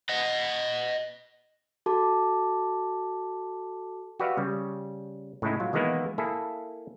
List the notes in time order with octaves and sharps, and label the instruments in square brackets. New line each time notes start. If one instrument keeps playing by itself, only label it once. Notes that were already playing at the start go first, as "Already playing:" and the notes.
[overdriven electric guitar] D#5 F#5
[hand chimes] F#4 A4 A5 D6
[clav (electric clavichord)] F#4 G4 B4 D5 E5 F5
C#3 G3
A2 C#3 G#3 D#4 E4
F#3 F4
D#3 E3 G#3 A#3 B3 E4
A#3 E4 G#4 A4